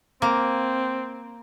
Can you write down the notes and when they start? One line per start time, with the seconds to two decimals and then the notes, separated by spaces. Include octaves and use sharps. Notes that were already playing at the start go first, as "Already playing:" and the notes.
0.22 A#3 C4